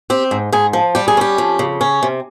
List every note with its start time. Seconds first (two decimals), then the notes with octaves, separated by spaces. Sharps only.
0.10 C4 G4
0.31 G#2
0.52 G#2 G#4
0.73 F3
0.95 G3 G4
1.08 G#4
1.17 C#4 G4
1.38 F2
1.59 C#3
1.81 C#4
2.03 C3